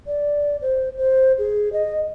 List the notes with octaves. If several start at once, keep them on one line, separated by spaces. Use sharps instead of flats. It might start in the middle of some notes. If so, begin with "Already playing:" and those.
D5
C5
C5
G#4
D#5